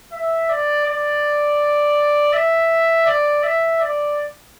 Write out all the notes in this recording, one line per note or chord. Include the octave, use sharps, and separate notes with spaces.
E5
D5
D5
E5
D5
E5
D5